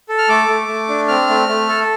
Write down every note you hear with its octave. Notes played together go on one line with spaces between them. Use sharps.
A4
F6
A3 D6
A3
A3
D4
C4 F6
A3
A3
A4